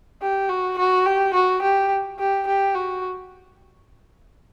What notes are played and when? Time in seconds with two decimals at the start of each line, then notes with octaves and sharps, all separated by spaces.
0.22 G4
0.49 F#4
0.78 F#4
1.06 G4
1.34 F#4
1.62 G4
2.19 G4
2.47 G4
2.75 F#4